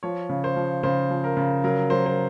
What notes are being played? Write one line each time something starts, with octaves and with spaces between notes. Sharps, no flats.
F3 C#5
C#3
C5
F3
C#3 C5
F3
A#4
C#3
F#3 A#4
F#3 C5
C5